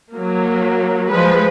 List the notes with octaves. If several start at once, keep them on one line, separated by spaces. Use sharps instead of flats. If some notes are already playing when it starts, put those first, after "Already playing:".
F#3 A#3
F3 G#3 B4